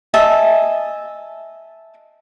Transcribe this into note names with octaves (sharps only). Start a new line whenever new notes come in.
D#5 E5 G#5 A5